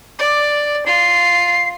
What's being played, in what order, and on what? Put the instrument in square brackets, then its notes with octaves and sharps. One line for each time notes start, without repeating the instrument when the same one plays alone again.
[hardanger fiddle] D5 [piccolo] D6
[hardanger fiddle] F4 [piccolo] C7